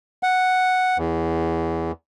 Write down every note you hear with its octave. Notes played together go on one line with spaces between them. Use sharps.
F#5
E2